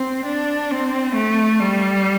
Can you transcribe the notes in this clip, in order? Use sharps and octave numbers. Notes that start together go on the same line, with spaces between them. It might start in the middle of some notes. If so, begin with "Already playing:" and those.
Already playing: C4
D4
C4
A3
G3